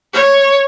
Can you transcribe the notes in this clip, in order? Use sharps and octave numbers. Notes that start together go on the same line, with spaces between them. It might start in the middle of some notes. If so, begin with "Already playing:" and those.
C#5